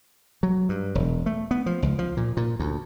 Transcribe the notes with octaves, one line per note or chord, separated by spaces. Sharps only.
F#3
G2
E1
A3
B3
F3
C#2
F3
A#2
A#2
D2